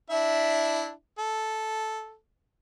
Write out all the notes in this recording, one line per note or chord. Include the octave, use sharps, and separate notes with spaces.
D4 E4 E5
A4